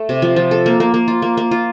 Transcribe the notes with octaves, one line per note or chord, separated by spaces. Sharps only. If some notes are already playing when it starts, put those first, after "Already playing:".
Already playing: A3
C3
F3
F3
A4
A#3
A#3
A#3
F4
A#3
A#3
F4